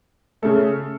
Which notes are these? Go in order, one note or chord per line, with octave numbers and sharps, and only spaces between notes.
C#3 A3 A4